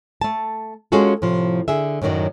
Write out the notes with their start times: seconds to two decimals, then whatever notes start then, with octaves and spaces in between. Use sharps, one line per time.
0.21 A3 A5
0.92 G#3 C#4 F4 F#4 G#4 A4
1.22 A2 C3 F3
1.68 D3 G#4 E5
2.02 F#2 A2 D#3 F#3 D5